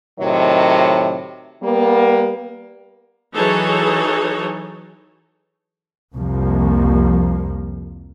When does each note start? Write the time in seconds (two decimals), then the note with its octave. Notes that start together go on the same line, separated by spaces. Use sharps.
0.19 A2 C3 D#3 F#3 C#5 D#5
1.62 G3 A#3 B3
3.33 E3 F#3 D#4 G#4 A4 C#5
6.15 C2 F2 F3 A#3